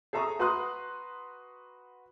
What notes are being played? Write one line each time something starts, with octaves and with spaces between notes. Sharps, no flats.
G#4 A4 E5 A#5 C#6 D#6
F#4 B4 A#5 C6 D#6 F#6